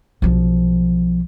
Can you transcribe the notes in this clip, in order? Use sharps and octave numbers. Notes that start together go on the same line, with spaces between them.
B1 F3